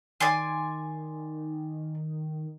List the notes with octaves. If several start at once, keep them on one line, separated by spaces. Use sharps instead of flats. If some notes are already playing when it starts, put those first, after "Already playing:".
D#3 D5 G#5 C6